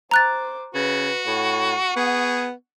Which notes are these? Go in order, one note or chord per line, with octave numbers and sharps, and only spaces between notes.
C5 A#5 D6 F#6 A6
C#3 F#4 B4
A2 F#5 C#6
B3 G#4